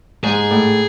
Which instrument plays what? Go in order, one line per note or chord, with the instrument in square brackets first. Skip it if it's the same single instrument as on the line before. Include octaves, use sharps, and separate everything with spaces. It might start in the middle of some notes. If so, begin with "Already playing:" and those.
[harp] G#2 [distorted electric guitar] G#4
[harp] A2